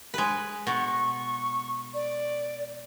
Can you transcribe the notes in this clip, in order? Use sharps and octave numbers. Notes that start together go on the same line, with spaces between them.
G#3 B4
B2 C#6
D5